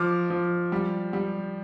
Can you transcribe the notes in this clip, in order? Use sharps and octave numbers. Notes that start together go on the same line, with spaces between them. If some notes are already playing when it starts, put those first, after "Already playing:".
Already playing: F3 D6 F6
F3
G3
G3